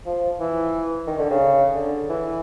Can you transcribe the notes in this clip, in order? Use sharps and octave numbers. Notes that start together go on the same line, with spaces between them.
F3
E3
D#3
D3
C#3
D3
E3